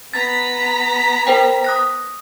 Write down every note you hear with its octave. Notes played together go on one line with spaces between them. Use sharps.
B3 A#5 A6 B6
A#4 C5 G5
D#6 F#6 A#6